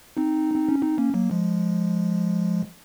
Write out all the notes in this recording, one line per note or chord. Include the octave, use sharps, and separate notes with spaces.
C4 D#4
C4
C#4
C4 D#4
A#3 C#4
F#3 A#3
F3 G#3